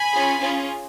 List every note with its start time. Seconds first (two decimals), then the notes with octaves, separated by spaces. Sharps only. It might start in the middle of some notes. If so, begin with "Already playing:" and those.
Already playing: G#5 B5
0.13 C#4 F4 G#4
0.41 C#4 F4 G#4